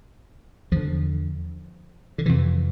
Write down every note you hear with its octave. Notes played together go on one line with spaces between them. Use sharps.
E2 D3 F3
D3
F2 C3 E3